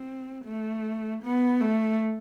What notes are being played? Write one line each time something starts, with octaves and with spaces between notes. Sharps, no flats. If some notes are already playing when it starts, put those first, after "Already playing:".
Already playing: C4
A3
B3
A3